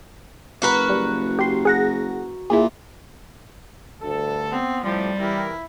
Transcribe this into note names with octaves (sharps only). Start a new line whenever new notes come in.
F#1 F#4 A#4 B4
G3
G4 C6
G#4 F#5 A#6
A#2 E4 G#4
D2 G2 A4
B3 C4
A2 C3 F3 G3 G4
E3 E4 G4 A#4